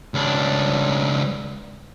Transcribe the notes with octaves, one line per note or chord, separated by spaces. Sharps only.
C#2 D4